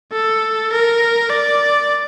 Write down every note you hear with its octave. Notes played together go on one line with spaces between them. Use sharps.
A4
A#4
D5